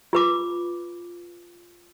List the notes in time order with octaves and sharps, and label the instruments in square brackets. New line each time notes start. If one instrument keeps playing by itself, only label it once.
[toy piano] F4 B4 D6